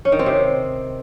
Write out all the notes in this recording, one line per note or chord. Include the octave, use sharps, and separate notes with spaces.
C#4
D#3
C4
C3